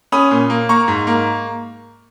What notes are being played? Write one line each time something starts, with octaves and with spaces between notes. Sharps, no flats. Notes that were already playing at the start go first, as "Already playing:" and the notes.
C#4 B5 D#6
A#2
A#3
A#3 A#5 C#6
G#2
A#3